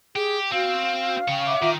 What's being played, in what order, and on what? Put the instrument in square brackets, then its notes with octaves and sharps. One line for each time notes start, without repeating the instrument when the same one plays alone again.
[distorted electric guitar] G4 [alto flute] G#4
[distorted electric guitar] C4 [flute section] F#4 [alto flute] F5
[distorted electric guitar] C#3 C#5 [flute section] G5
[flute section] E5 F#5 D6
[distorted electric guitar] D#3 [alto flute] F4